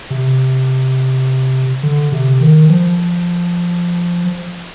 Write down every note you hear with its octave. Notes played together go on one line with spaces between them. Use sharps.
C3
D3
C3
D#3
F3